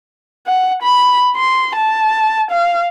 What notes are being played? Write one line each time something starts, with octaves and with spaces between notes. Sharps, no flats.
F#5
B5
C6
A5
F5